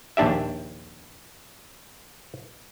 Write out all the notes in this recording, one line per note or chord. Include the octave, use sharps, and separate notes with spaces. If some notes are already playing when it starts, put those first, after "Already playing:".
A#1 D#2 D4 G4 E5